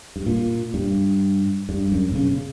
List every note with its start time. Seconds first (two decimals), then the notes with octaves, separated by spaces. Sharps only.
0.16 G2
0.27 A#2
0.74 G2
1.69 G2
1.92 F#2
2.12 B2
2.15 C#3